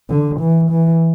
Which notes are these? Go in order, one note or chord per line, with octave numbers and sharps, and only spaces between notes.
D3
E3
E3